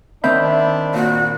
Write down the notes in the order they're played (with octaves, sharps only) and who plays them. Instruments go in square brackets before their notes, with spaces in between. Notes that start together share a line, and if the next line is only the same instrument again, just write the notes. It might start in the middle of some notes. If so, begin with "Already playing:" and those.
[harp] D#3 C4 G6 [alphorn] D4 [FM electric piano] E5 B5
[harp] A#2 [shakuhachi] F#4